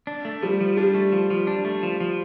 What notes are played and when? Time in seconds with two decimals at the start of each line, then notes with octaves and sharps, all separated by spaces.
0.07 D4
0.25 A3
0.42 F3 G3
0.61 F3
0.77 G3 D4
0.95 A3
1.13 F3
1.30 F3
1.47 D4
1.65 A3
1.83 F3
2.00 F3